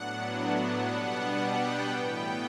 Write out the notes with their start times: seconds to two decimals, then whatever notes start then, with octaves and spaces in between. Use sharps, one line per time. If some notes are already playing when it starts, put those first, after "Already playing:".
Already playing: A2 F#3 B3 D4 F#5
0.85 B2 G3 B3 D4 F#5
1.37 G5
1.87 A2 E3 B3 G5